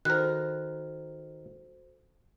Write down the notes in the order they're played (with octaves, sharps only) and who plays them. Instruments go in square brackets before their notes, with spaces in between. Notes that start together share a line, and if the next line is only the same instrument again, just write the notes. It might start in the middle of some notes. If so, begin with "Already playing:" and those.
[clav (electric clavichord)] D#3 A#4 [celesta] F#4 A4 C5 [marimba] F#6